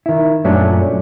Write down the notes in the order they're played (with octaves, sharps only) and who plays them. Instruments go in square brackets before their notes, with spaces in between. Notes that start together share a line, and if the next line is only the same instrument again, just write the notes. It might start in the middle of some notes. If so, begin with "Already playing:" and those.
[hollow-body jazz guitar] D#3 E4
F#2 A#2 F#3 A3 C#4 D4